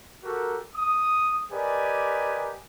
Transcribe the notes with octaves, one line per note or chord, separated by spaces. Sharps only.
F#4 G4 A4 A#4
D#6
G4 A#4 B4 D5 D#5 G#5